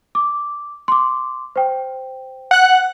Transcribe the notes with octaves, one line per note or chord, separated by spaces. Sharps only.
D6
C6 D6
C5 G5
F#5 F#6